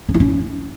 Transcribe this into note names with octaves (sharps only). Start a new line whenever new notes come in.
C#4
E4
C#4